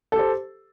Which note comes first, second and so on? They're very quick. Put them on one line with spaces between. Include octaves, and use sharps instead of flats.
A4 G4 C5